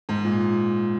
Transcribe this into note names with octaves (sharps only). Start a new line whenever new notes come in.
G#2
A#2